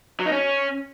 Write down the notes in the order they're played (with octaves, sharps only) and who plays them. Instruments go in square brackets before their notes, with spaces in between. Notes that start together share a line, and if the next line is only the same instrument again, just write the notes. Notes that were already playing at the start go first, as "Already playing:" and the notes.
[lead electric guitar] F#3
D#4
C#4